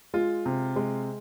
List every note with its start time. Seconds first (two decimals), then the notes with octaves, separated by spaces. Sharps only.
0.14 G#3 F4
0.46 C3
0.76 G#3